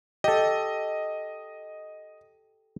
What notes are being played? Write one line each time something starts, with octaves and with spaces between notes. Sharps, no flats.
G4 A4 D#5